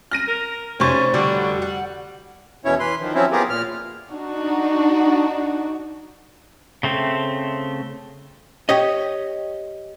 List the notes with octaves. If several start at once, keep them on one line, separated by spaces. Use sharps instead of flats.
F6 A#6 D#7
A#4
F1 C3 C#4 C5 C#6 A6
D3 G3 D4 F#4
F#5
E2 B2 C#4 E4 C#5
E3 B4 C6
D#3 F3
F3 F#3 C4 C#4 E4
B3 F4 G4 G#4 A#4
A#2 F6
D4 D#4 F#4
C#3 A3 C4
G4 C#5 D#5